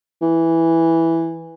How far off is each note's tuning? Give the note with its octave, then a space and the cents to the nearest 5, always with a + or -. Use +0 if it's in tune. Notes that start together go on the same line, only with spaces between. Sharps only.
E3 -5